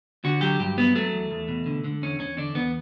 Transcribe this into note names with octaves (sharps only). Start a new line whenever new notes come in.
D3 F#4
F#3 G4
G2 G4
F#3 B3
F#3 A3
E2
E2
B2
D3
D3
E2 C#4
E2 C#4
D3 D4
E2 B3